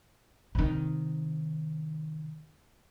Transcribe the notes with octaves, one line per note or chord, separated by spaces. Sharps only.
C3 D#3